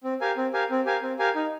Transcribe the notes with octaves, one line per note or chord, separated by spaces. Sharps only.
C4
G4 A#4 F5 G#5
C4
G4 A#4 F5 G#5
C4
G4 A#4 F5 G#5
C4
G4 A#4 F5 G#5
D#4